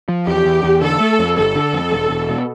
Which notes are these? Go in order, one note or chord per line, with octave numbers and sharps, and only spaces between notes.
F3
E2 G4
E2
E2
D3 A4
A3
F2
G1 A4
D3
F2
E1
E1
B2